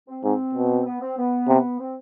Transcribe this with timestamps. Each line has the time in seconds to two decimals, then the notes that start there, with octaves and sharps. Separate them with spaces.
0.08 C4
0.23 G#2 C4
0.55 B2
0.86 B3
1.01 C4
1.17 B3
1.48 C3
1.79 C4